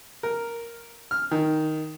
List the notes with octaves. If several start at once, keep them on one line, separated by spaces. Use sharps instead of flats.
A#4
F6
D#3